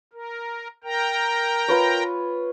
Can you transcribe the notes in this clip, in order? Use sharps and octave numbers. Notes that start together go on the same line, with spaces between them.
A#4
A#4 G5 A#5
F4 B4 C#5